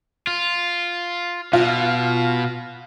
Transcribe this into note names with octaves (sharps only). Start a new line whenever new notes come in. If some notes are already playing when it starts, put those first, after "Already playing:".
F4
B2 F4